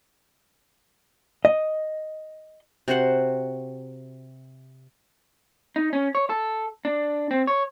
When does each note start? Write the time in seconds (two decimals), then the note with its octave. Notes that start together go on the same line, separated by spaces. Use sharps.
1.45 D#5
2.88 C3 F#4 C5 F#5
5.76 D#4
5.93 C#4
6.15 C#5
6.30 A4
6.85 D4
7.31 C4
7.47 C#5